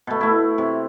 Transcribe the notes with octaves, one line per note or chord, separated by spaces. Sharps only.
B2 A3
A3 E4
C3